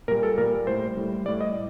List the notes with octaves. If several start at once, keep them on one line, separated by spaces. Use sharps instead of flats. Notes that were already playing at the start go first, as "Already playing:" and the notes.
A#2 G3 A#4
A4
A#2 G3 A#4
A2 G3 C5
A2 G3
A2 G3 D5
D#5